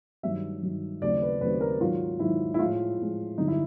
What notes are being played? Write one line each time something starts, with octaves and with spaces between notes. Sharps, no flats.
G2 D#3 F#3 E5
G2 D#3 F#3
D#2 C#3 F#3 A3 C4 D5
B4
D#2 C#3 F#3 A3 C4 B4
A#4
G#2 D#3 F#3 F4
G#2 D#3 F#3 E4
E4
A2 F3 G#3 F4
A2 F3 G#3
G2 D3 F#3 D#4
E4